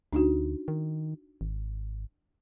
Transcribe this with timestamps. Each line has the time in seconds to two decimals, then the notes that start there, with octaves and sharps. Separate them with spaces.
0.13 D2 D4 D#4 F#4
0.68 D#3
1.41 G#1